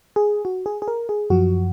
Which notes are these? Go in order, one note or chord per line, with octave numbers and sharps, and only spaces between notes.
G#4
F#4
G#4
G#4
A#4
G#4
F#2 F3 F#4